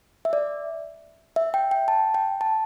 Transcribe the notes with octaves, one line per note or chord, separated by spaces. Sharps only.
E5
D5
E5
G5
G5
A5
G5
A5